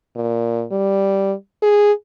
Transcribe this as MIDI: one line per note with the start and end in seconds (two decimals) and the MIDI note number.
0.16 0.64 46
0.71 1.33 55
1.62 1.92 68